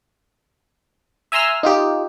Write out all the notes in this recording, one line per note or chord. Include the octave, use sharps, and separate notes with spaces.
E5 G#5 A#5 C6 E6 F6
D#4 F4 G4